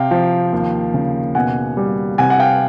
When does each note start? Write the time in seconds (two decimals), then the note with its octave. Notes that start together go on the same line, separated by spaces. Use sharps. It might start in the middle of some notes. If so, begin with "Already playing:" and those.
Already playing: C3 F5 G5
0.11 F3
0.53 D#2
0.94 C#3
1.35 B2 F#5 G#5
1.77 G3
2.18 C3 F#5 G#5
2.30 F#5
2.39 F5 G5